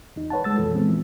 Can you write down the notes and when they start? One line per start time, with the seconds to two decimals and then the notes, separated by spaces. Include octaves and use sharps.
0.16 E2 D#4
0.30 B4 C#5 F#5 A5
0.44 G#3 E6 A6
0.57 C2 F2 B2 E3 F3 A4
0.73 A#2 E3 G#3 B3 C4
0.89 E3 F3